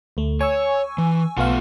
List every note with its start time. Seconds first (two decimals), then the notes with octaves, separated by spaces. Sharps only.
0.17 D2 A3
0.41 C#5 G#5 C#6 E6
0.98 E3
1.37 B1 A3 B3 F4 F5 F#5